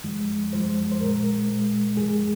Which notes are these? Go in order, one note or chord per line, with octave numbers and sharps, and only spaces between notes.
F#2 F3 G#3
F#2 F3 G#3 C5
C5
A#2 G#3 A#4
A#2 G#3
F#2 F3 G#3 G#4